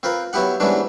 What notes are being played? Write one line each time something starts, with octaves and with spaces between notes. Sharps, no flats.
C4 F4 A#4 B4
F#3 B3 E4 G4 F#5
G#2 E3 G3 B3 C#4 D4